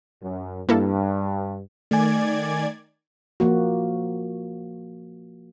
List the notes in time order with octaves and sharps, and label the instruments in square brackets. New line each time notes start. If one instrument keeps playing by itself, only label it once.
[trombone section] F#2
[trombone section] G2 [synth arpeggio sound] A#3 E4 A4
[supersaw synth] D#3 D5 G#6 [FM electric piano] A3 G#5
[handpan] F3 A#3 F#4